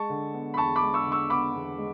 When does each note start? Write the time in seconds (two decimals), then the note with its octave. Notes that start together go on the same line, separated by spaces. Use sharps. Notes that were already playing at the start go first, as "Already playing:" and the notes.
Already playing: G#3 A5 C#6
0.09 D3
0.34 B3
0.54 B5
0.57 E2 A5 C#6
0.76 B5 D6
0.82 G#3
0.94 C#6 E6
1.06 D3
1.12 C#6 E6
1.30 B3 B5 D6
1.55 E2
1.78 G#3